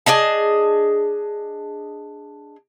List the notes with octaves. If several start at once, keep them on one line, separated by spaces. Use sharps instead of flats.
D4 G#4 D#5 A5